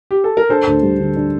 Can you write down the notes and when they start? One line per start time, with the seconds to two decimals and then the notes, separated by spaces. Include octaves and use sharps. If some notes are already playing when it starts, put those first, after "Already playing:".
0.11 G4
0.24 A4
0.37 A#4
0.49 D4 A4 C5
0.67 D2
0.83 G3
1.00 D3
1.16 D4